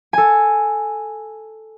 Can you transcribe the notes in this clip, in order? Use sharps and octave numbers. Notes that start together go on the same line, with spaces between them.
A4 G#5